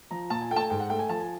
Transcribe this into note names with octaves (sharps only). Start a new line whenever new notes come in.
F3 A#5
A#2 A5
G#5
A3 G5
A5
G#5
G#2 G5
F#5
A3 G5
G#5
F3 A5
G#5